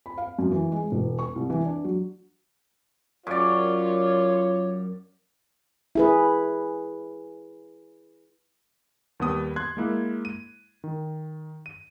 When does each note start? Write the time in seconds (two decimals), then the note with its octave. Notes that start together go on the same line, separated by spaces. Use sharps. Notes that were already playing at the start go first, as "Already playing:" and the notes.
0.06 B5
0.18 F5
0.39 F#2
0.51 E3
0.72 G#3
0.92 E1
1.19 C#6
1.36 C2
1.50 E3
1.65 D4
1.84 F#3
3.27 F#2 F4 C#5 D5
5.95 E4 G#4 B4
9.20 D#2 G3 B3 D#6
9.56 C6 F#6 G#6
9.77 G#3 A#3 E4
10.25 D#7
10.84 D#3
11.66 D#7